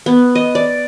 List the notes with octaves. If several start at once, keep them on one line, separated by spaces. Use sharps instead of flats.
B3
D#5
D5